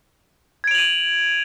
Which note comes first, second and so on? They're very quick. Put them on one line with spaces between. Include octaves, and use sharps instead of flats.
G#6 D7 F7 F#7 D#7